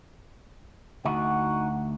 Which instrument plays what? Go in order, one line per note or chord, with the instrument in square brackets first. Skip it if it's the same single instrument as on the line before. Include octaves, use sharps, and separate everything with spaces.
[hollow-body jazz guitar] D2 [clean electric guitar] D#4 F#4 [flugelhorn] F#5